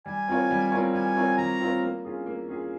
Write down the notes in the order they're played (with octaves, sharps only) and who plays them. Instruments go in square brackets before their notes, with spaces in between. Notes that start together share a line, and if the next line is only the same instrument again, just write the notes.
[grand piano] G3 [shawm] G#5
[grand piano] C4 F4 A#4 C#5
G3
C4 F4 A#4 C#5
[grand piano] G3 [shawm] G#5
[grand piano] C4 F4 A#4 C#5
[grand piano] G3 [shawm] A#5
[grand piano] C4 F4 A#4 C#5
A#3
C#4 F4 G#4
A#3
C#4 F4 G#4